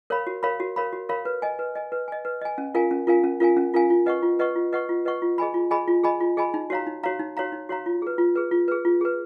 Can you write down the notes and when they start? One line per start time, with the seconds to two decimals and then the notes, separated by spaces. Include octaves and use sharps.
0.10 A#4 C#5 F5 B5
0.27 F#4
0.43 A#4 C#5 F5 B5
0.60 F#4
0.76 A#4 C#5 F5 B5
0.93 F#4
1.09 A#4 C#5 F5 B5
1.25 B4
1.42 D#5 G#5
1.59 B4
1.75 D#5 G#5
1.92 B4
2.08 D#5 G#5
2.25 B4
2.42 D#5 G#5
2.58 C#4
2.74 F4 A#4 F5 G#5
2.91 C#4
3.07 F4 A#4 F5 G#5
3.24 C#4
3.40 F4 A#4 F5 G#5
3.57 C#4
3.74 F4 A#4 F5 G#5
3.90 F4
4.06 B4 D#5 F#5 C#6
4.23 F4
4.39 B4 D#5 F#5 C#6
4.55 F4
4.72 B4 D#5 F#5 C#6
4.89 F4
5.05 B4 D#5 F#5 C#6
5.22 F4
5.38 G#4 D#5 G#5 B5
5.54 F4
5.71 G#4 D#5 G#5 B5
5.88 F4
6.04 G#4 D#5 G#5 B5
6.20 F4
6.37 G#4 D#5 G#5 B5
6.54 D#4
6.70 F#4 C#5 F5 A#5
6.87 D#4
7.03 F#4 C#5 F5 A#5
7.19 D#4
7.37 F#4 C#5 F5 A#5
7.52 D#4
7.69 F#4 C#5 F5 A#5
7.86 F4
8.02 G#4 B4
8.18 F4
8.35 G#4 B4
8.51 F4
8.68 G#4 B4
8.85 F4
9.01 G#4 B4